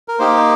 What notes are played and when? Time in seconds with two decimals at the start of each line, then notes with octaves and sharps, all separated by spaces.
0.08 A#4
0.19 A#3 D#4 G4 C5